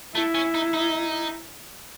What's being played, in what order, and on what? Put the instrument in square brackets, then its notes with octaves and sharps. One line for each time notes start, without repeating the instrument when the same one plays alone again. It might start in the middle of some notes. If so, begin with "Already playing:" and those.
[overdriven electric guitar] A3 [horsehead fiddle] E4
[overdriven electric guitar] C#4
D#4
D#4